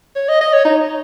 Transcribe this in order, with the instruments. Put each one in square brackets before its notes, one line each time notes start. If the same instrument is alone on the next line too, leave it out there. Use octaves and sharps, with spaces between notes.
[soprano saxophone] C#5
D#5
D#5
C#5
D#4